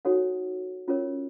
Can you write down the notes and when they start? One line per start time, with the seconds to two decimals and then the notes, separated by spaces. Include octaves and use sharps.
0.05 D#4 F#4 A4 C#5 F#5
0.88 C#4 F4 A#4 C#5